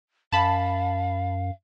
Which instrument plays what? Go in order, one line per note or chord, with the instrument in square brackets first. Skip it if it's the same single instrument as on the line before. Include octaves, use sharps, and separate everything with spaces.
[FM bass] F#2 [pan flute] F5 [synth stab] A5 B5